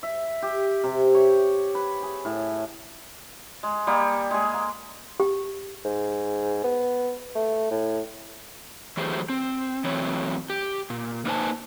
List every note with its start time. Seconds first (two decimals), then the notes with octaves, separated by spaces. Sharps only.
0.03 E5
0.42 G4
0.84 C3
1.15 C#5
1.75 B4
2.03 G#4
2.25 A2
3.63 G#3
3.87 G3 A#3 G#4
4.31 G#3 G#4
4.54 A#3
5.20 G4
5.85 G#2
6.64 B3
7.35 A3
7.71 A2
8.97 E3 F#3 A3 G4 G#4 C5
9.29 C4
9.84 E3 F#3 A3 C4 C#5
10.50 G4
10.90 A#2
11.25 A#3 D#4 B4 C5 G#5 A5